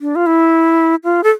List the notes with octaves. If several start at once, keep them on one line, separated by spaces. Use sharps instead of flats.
D4
F4
E4
F4
A4